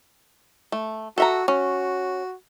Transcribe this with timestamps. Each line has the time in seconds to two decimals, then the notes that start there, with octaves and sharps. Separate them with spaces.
0.72 A3
1.18 F#4 A4 E5 A#5
1.48 C#4 F#4